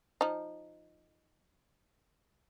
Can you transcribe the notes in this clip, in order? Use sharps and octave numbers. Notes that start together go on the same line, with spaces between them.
F3 D#4